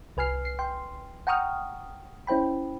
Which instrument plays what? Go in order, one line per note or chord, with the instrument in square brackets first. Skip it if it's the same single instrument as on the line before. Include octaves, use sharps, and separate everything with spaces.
[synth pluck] C2 B4 G#5 F6 C7
C7
G5 C6
F#5 G5 A#5 C#6 D#6 F6
C#4 E4 C5 G5 B5